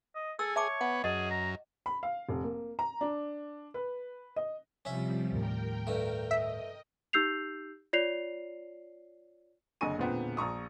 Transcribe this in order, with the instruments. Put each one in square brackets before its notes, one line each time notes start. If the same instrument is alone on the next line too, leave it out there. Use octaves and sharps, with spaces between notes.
[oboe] D#5
[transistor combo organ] G#4 [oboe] A4 [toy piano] E6
[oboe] C#5 [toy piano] E5 A5 D6
[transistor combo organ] B3 [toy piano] F#5
[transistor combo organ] F#2 [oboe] G#4 [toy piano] D#5
[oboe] A#5
[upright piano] B5
F5
F1
A#3
A#5
D4
B4
D#5
[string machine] C3 F3 G3 [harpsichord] C#4 E5
[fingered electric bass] D#2 A2 [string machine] A#4 G5
[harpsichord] G2 A3
[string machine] D#5 [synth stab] E5
[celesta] D#4 G4 E6 G6 C7 F7
F4 C#5 D5 C7 F7
[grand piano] F#1 D3 D#5 G#5 C#6 D#7
E1 A#2 D3 B3 C4
A#1 A#5 C#6 D#6